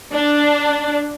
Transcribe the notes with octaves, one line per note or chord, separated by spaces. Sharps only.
D4